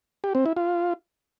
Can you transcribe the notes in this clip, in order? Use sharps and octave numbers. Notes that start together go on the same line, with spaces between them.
G4
C4
E4
F4